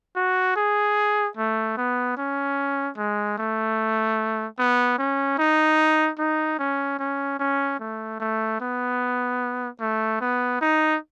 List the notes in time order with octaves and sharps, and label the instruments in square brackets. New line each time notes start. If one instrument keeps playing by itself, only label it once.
[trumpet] F#4
G#4
A3
B3
C#4
G#3
A3
B3
C#4
D#4
D#4
C#4
C#4
C#4
A3
A3
B3
A3
B3
D#4